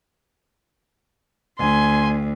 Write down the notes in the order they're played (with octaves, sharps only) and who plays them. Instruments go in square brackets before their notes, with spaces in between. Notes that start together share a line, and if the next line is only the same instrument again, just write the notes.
[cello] D2 [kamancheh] G#5 C6